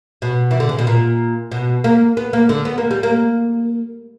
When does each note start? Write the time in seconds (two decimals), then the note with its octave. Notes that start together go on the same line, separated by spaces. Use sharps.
0.22 B2
0.51 E3
0.60 D3
0.69 C#3
0.78 B2
0.87 A#2
1.52 B2
1.84 A#3
2.17 B3
2.33 A#3
2.49 D3
2.65 B3
2.78 A#3
2.91 G3
3.03 A#3